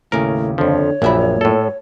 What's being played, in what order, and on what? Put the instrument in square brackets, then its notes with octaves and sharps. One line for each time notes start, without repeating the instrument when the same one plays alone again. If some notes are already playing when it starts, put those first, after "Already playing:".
[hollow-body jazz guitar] D#2 C#3 [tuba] A2 [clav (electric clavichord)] A#4
[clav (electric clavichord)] F2 F3 [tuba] D3 [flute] C#5
[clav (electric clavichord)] A#1 [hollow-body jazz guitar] F#2 E5 B5 [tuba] A#2
[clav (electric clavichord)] A2 A4